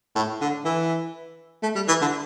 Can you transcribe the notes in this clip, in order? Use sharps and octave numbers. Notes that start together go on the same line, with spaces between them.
A2
D3
E3
A3
G3
E3
D3